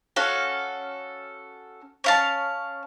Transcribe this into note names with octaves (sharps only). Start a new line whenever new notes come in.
C#4 F#4 A4 F5
C#4 F5 A5